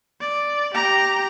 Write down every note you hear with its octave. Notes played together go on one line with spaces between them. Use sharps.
D5
G4 A#5